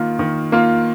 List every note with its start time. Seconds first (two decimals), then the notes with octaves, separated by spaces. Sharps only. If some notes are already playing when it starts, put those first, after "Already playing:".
Already playing: D#3 A#3 F4
0.19 D#3
0.52 A#3 F4